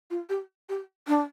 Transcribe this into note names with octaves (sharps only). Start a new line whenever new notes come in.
F4
G4
G4
D4